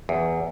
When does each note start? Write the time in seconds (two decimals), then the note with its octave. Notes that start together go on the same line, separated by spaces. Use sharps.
0.09 E2